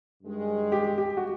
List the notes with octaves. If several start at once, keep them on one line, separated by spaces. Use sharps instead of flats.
G2 D#3 G#3
G4
G4
F#4